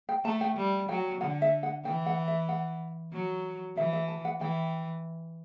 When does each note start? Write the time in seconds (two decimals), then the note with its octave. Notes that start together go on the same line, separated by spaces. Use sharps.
0.09 G5
0.25 A3 A5
0.41 G5
0.57 G3
0.89 F#3 G5
1.21 D3 F#5
1.42 E5
1.63 F#5
1.85 E3 G5
2.06 F#5
2.28 E5
2.49 F#5
3.13 F#3
3.77 E3 E5
3.93 E5
4.08 A5
4.25 F#5
4.41 E3 G5